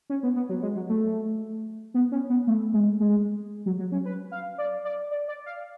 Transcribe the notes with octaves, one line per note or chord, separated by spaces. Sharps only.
C#4
B3
B3
F#3
G#3
F#3
A3
B3
C#4
B3
A3
G#3
G#3
F#3
F#3
C#4
B4
F5
D5
D5
D5
D5
F5